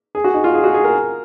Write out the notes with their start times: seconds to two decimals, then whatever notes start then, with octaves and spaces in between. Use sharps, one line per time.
0.15 G#4
0.24 F#4
0.34 D#4
0.44 F4
0.54 G#4
0.64 F#4
0.74 G#4
0.84 A#4